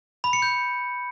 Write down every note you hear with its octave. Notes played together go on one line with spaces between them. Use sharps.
B5
C#7
G6